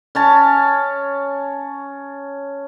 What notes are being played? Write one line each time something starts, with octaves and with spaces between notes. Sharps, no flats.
C#4 C#5 A5